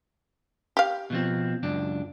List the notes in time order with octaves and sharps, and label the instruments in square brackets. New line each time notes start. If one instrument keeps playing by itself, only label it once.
[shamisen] G4 F5
[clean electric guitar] B2 F3 C4
C#2 F#2 D4